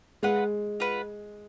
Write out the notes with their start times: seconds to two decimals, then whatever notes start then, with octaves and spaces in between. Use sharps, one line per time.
0.23 G#3 F4 B4 F#5
0.80 F4 B4 F#5